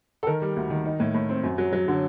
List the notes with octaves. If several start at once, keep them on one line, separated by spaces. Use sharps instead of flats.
A4
D#3 A#4
G3
D2
D#3
D#4
A2
A2
C4
F#2
F#3
F#3
D3